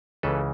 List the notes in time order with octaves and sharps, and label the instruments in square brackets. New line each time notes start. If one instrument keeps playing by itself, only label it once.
[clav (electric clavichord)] C#2 C#3 E3 A4 B4